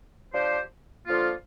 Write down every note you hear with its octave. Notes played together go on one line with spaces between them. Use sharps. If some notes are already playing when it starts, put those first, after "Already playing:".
F3 D4 G4 C5
D3 F3 A#3 F4